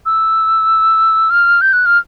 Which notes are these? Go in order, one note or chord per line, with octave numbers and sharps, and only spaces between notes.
E6
F6
G6
F#6
F6